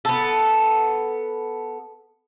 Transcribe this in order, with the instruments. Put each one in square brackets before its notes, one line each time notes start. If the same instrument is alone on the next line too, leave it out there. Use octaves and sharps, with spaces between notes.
[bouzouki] B3 A4